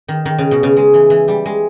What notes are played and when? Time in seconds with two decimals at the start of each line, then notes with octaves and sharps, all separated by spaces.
0.08 D#3
0.25 D#3
0.38 C#3
0.51 B2
0.63 C#3
0.77 G#3
0.94 E3
1.10 E3
1.28 G3
1.45 G#3